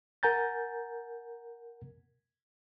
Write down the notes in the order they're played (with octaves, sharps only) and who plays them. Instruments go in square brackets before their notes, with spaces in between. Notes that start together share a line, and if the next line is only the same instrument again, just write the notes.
[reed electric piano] A#4 F#5 G#5 A#5 G6 A6